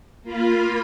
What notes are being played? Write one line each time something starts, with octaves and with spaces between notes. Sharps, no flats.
A#3 F4 B5